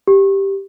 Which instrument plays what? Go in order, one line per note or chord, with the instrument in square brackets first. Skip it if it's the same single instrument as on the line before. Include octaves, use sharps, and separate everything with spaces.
[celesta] G4